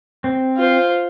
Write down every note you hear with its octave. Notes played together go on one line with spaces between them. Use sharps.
C4
F4 C5